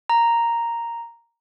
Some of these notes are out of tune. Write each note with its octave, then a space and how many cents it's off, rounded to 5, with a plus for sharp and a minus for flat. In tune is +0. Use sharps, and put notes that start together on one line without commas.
A#5 +0